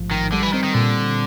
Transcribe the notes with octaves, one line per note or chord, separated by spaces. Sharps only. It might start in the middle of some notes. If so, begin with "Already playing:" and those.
Already playing: A1 G#2 F3
A1 D#3
D3 G3
E3
D#3 C4
D#3
A#2 D3
A#2